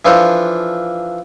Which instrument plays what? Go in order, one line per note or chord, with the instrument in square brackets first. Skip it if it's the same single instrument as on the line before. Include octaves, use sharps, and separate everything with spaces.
[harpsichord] E3 F3 D4 F4 A4